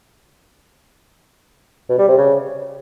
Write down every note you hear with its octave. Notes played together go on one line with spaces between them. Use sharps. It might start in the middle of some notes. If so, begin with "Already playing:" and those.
B2
G3
C3
C#3